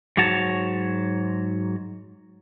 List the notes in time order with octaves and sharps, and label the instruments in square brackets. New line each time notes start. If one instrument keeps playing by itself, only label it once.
[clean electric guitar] G#2 F#3 F#4 C#5 A5